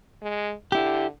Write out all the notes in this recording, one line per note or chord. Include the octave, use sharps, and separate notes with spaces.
G#3
D3 E4 G4